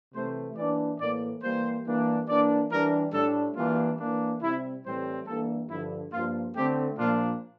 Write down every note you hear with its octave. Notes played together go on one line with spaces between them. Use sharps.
C3 E3 A3 C5
E3 A#3 D4 D5
A2 E3 A#3 D5
E3 G3 A#3 C5
E3 G3 A#3 D4
E3 A#3 D4 D5
E3 G3 D4 A#4
A2 G3 D4 A4
E3 G3 A#3 D4 F4
E3 A#3 D4
C3 G3 C4 E4
A2 E3 G3 C4 C5
E3 G3 A#3 D4 A4
G2 D3 F3 E4
G2 F3 A#3 F4
D3 A3 C4 G4
A#2 F3 A#3 D4 F4